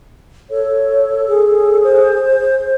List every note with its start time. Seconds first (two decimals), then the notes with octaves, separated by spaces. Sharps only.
0.50 A4 C#5
1.28 G#4
1.83 C5